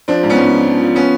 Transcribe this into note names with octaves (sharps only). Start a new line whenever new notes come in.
F3 C4 D4
G#2
B3 C#4
G#2
F3
F3
F3
B3 C#4